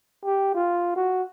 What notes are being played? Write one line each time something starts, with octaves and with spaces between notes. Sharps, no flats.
G4
F4
F#4